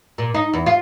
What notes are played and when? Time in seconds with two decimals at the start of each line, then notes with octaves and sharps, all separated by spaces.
0.18 A#2
0.35 D#4
0.53 E2
0.66 F4